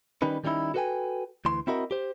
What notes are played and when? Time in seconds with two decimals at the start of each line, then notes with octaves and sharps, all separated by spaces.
0.22 D#3 G3 C#4 D#4 B4
0.44 D#3 G3 C#4 D#4 E4
0.74 F#4 A4 B4 F5 G5 G#5
1.45 D2 E3 C6
1.67 C4 E4 F#4 A#4 D#5
1.91 G4 C5